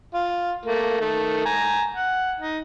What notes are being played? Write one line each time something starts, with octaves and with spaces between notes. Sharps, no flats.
F4
A3 A#3
D#3 A3
G#5 A#5
F#5
D#4